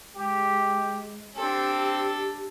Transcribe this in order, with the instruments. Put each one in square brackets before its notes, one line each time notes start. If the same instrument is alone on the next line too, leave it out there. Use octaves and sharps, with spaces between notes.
[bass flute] G#3 [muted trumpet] G4
[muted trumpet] C4 [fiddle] D4 A4 [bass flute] G4